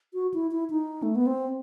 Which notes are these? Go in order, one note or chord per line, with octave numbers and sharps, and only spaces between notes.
F#4
E4
E4
D#4
A3
B3
C4